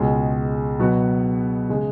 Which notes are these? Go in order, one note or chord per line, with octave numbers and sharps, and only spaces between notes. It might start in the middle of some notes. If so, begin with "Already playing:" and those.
Already playing: C#2 B2 G#3 C#4
B2 F#3 B3 F#4
C#3 G#3